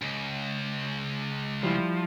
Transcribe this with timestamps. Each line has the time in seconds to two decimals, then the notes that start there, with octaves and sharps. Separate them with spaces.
0.02 C#2
1.63 F3 G3 E4